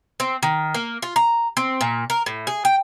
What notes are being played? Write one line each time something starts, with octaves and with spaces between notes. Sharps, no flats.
C4
D#3
A#3
F4
A#5
C4
A#2
A#4
A2
G#4
G5